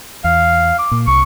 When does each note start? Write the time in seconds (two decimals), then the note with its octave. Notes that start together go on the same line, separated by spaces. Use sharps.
0.24 E2 F5
0.79 D6
0.91 A#2
1.07 C2 C#6